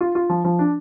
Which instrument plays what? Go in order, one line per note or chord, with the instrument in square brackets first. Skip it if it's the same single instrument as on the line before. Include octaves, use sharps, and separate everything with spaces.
[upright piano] F4
F4
F3
F3
D4